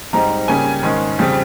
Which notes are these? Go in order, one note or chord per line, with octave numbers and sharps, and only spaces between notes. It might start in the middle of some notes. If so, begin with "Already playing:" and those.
G#2 G3 C4 D#4 A#5
C#3 G3 A#3 C#4 G#5
G#2 D#3 G#3 C#4
F2 C#3 G3 C4